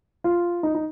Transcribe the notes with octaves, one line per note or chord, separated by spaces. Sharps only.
F4
D#4
D#4